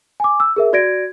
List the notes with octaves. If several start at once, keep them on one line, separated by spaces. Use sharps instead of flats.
G#5 D6
E6
G#4 A#4 E5
F#4 D5 G#6 A#6 D7